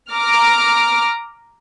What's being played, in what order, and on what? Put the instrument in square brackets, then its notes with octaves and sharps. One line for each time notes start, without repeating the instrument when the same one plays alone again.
[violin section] A#5 D6 F6